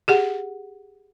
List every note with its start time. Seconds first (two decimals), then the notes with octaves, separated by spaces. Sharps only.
0.08 G4 G#4 F#5